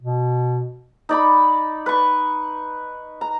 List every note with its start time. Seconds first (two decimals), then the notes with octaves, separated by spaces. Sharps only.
0.01 B2
1.09 D#4 D5 B5
1.86 B4 C#6
3.21 A#5